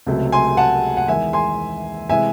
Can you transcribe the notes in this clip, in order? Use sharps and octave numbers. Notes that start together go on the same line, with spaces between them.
C#2 C3 F#3 A3
G#5 C6
F#5 A5
F#5
E2 D#3 G#3 E5 G#5
G#5 C6
C3 E3 G#3 E5 G#5